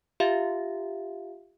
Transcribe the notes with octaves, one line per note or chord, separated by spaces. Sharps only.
F4 G4 E5 F5